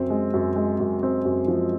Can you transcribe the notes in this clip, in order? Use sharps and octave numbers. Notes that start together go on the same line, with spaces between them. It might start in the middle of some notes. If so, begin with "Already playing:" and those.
Already playing: F#2 C4
G#3
F#2
G#3
F#2
C4
F#2
F3